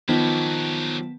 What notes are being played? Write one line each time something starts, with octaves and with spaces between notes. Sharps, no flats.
D#3 F3 F#3 B3 G4 B6 E7